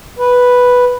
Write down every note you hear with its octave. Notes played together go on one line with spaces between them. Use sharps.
B4